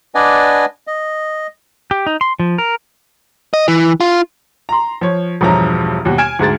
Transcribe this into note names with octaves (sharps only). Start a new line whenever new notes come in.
D4 B4 D5 D#5 F#5 G#5
D#5
G4
D#4
C6
F3
A#4
D#5
E3
F4
A#5 C6
F3 C#5
E1 G2 E3 F3 C#5 A#5
D#2 B2 G3 F#4
G#5 F6 G#6 D7 E7
D2 G#2 G#4 A6